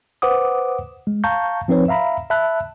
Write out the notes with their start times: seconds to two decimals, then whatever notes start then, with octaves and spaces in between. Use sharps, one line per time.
0.22 B4 C5 F#5 D6 D#6
1.07 G#3
1.24 F5 A5 A#5 C#6 G6
1.68 F3 C4 D#4 B4 C#5
1.88 E5 F5 A#5 B5
2.30 E5 A5 B5 F#6